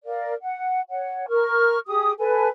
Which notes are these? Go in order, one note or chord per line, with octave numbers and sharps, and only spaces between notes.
A#4 D5 F5
F#5
C#5 F#5
A#4 C#6 F6
G4 G#4 D#6
A4 B4 G#5